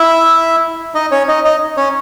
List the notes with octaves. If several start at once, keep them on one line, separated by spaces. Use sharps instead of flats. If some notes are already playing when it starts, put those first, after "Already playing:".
Already playing: E4 E5
D#4 D#5
C#4 C#5
D#4 D#5
D#4 D#5
C#4 C#5